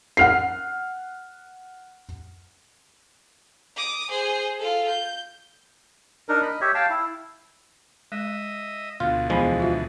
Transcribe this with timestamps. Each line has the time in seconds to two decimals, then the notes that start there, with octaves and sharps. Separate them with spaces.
0.17 F#5 F6 C7
3.76 D6 D#6
4.09 G#4 C5
4.59 F4 A4
4.88 G6
6.29 D4 D#4 A#4
6.42 D#5 B5
6.61 G4 C#5 E5
6.75 F5 G5 A5
6.90 E4
8.12 G#3 D#5 E5
9.00 D2 B2 F4
9.30 E2 F3 G#3 B3 B5
9.60 F4 F#4 E5